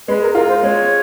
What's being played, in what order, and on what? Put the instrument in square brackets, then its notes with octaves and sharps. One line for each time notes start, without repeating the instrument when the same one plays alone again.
[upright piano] G#3 [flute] B4
[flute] A#4
[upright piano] F4 [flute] A#4
[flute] C5
[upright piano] G#3 [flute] C#5